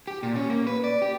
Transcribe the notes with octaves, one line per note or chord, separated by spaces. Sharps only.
G4
A#2
C#4
A#3
B4
D5
G4